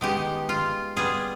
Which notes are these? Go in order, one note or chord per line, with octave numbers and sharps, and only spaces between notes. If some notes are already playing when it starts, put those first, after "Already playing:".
D#3 G#3 B3 D#4 G4
F4
G3 B3 F4 G#4